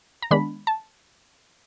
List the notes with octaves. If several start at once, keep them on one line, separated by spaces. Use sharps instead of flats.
A#5
D#3 G#3 B3 D4 B5
A5